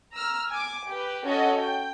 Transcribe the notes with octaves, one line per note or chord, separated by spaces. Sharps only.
A#5 E6 F6
G#5 D6
G4 B4
C#4 F#4 A4 D#5
G5